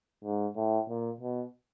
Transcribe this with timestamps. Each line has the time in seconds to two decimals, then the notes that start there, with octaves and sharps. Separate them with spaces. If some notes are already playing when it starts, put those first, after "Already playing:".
0.24 G#2
0.56 A2
0.89 A#2
1.20 B2